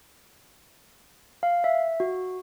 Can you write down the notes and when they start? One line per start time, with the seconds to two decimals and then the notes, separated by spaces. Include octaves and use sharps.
1.43 F5
1.64 E5
2.00 F#4